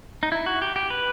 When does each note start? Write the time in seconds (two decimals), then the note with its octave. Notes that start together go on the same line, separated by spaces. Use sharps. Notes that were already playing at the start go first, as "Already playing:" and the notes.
0.23 D#4
0.32 E4
0.46 F#4
0.62 G4
0.76 G4
0.90 B4